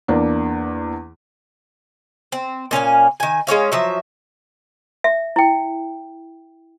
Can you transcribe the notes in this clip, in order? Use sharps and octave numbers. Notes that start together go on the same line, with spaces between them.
E2 A#3 D4
C4
A#2 C#4 F5 G#5
D#3 G#5
G#3 C#4 C#5 F5
F3 F#3 E5
E5
E4 G5